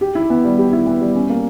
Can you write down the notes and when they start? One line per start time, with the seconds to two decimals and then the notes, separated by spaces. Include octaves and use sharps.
0.01 G4
0.15 E4
0.30 B3
0.44 G3
0.58 G4
0.73 E4
0.87 B3
1.01 G3
1.15 C#4
1.30 A#3